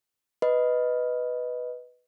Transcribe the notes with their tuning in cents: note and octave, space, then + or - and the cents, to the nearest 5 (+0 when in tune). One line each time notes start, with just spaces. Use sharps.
B4 +0 D#5 +5